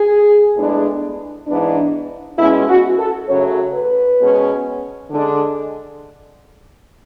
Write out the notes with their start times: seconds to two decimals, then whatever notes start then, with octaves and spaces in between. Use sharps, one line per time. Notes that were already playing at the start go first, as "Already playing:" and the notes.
Already playing: G#4
0.56 A2 G#3 B3 D4
1.47 G#2 E3 B3 D4
2.38 B2 G#3 C#4 E4
2.68 F#4
2.99 A4
3.29 F#2 C#3 F#3 A3 C#5
3.74 B4
4.20 B2 G#3 C#4
5.11 D3 G#3 D4